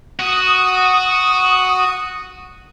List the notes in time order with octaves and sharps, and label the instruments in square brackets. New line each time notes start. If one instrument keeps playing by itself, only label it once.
[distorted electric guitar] F#4 [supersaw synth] D#6